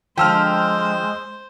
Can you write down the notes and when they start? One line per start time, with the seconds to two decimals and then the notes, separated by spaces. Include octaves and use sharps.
0.18 D3 F3 G#3 C5 G5 E6 F6